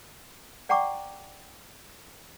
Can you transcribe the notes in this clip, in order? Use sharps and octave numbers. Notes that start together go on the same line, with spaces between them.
D5 F#5 G5 A#5 C#6 D6